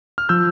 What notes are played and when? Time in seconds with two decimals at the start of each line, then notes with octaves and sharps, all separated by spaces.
0.18 F6
0.29 F3 E6 G6